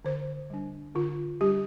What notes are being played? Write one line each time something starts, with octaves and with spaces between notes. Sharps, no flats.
D3 C5
G3 D4
D3 F4
G3 D4 G4